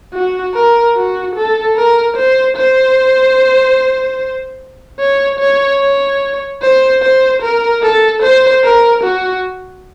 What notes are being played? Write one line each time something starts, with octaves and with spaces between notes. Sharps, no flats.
F#4
A#4
F#4
A4
A#4
C5
C5
C#5
C#5
C#5
C5
C5
A#4
A4
C5
A#4
F#4